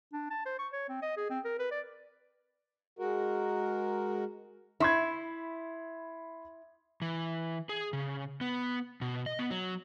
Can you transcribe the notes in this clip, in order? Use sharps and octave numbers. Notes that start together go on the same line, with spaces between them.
D4
A5
C5
C#6
C#5
C4
D#5
G#4
C4
A#4
B4
D5
G#3 F#4 A#4
E4 B5 C6 G#6
E3
G#4
C#3
B3
B2
D#5
B3
F#3